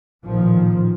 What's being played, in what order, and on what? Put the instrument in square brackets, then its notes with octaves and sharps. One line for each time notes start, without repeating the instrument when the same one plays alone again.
[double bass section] A1 A#2 D#3 F3